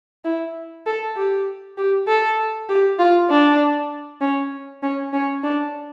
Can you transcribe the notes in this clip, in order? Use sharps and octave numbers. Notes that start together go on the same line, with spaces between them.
E4
A4
G4
G4
A4
G4
F4
D4
C#4
C#4
C#4
D4